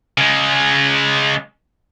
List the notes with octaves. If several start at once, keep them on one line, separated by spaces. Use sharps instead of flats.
C#3 G#3